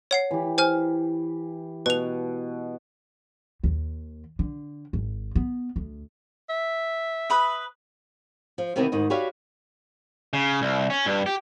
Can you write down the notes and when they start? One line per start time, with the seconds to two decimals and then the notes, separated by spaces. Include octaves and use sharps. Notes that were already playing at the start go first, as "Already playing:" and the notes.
0.11 C#5 F#5 C7
0.31 E3 G4
0.58 C5 G#5 F6
1.86 B2 B4 F7
3.63 D#2
4.39 D3
4.93 G#1
5.35 B3
5.76 D2
6.50 E5
7.30 B4 B5 D#6
8.58 F3
8.76 C3 D#3 E3 B3 C4
8.92 D2 G#2 D#3 D#5
9.10 F#4 G4 B4 C#5 D5 F5
10.33 C#3
10.62 C2
10.90 C#4
11.06 G2
11.26 G4